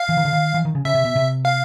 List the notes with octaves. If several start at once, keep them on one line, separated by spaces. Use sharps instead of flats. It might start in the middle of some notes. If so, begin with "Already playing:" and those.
Already playing: F5
E3
D#3
D3
D#3
E3
D#3
C#3
C#3 E5
C3
B2
C3
F5